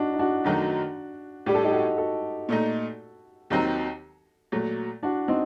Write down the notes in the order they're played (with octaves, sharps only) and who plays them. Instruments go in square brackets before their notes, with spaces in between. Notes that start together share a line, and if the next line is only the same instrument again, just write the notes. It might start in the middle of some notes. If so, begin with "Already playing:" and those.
Already playing: [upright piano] D4 D#4 F#4
D#4
D4 F#4
[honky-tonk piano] F#2 D#3 F#3 A3 D#4
[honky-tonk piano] A2 G3 D4 [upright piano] G4
[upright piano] A4
D#4 G4
F#4 A4
F#4 A4
[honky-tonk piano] A#2 A3 D#4
D#2 D#3 F#3 C4 D#4
A#2 F#3 A3
[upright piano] D4 F#4
C4 D#4